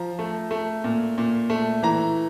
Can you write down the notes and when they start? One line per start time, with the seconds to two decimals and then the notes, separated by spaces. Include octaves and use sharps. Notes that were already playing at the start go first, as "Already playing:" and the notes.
Already playing: F3 A#5
0.19 A3
0.51 A3
0.84 A#2
1.18 A#2
1.50 A3
1.83 E3 A#5